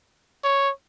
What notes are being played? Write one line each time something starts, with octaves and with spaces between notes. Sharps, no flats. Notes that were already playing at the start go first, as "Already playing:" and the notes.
C#5